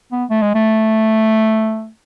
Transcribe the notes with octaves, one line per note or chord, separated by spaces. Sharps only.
B3
A3
G#3
A3